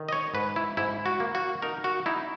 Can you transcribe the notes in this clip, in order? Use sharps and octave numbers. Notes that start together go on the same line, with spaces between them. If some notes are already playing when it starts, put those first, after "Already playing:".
Already playing: D#3
D#5
C#5
G#2 B4
E4
G#2 E4
F#4
A#3
F#4
D#4 A#4
F#4
D#4 E4